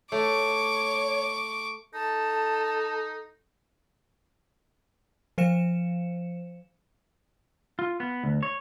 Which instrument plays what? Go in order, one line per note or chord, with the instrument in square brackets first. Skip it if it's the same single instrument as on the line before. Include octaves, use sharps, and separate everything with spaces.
[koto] A3 [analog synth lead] C#5 [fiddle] C#6 D6
[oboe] D#4 [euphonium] A4 [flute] A5
[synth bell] F3 C5 F5 C#7 E7
[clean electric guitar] F4
B3
D2
C#5